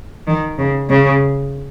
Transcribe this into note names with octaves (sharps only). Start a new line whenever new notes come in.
D#3
C#3
C#3